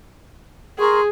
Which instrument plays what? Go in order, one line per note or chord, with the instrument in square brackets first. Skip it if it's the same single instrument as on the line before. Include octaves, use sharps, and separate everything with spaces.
[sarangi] G#4 [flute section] A#4 C6 C#6